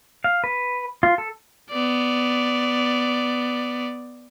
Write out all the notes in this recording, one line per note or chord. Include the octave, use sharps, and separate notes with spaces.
F5
B4
F4
A4
B3 D5